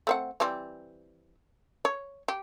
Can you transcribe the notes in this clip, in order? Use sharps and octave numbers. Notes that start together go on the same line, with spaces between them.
A3 C4 F#5
E3 G3 C4
C#5
G4